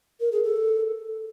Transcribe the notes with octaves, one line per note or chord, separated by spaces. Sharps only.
A#4
G#4
A4